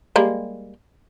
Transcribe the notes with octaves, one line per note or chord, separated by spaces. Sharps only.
G3 G#3 A#3